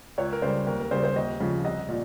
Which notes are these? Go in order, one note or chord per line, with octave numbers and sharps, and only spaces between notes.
C#2 C#5
A#4
C#3 G3 C5
D#2 A#4
A#4
C#3 G3 C5
C5
D#2 D#5
C#3 F3
C2 D#5
A#2